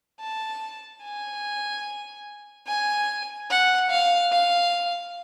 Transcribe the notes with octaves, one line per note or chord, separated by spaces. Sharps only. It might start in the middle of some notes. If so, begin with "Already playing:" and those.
A5
G#5
G#5
F#5
F5
F5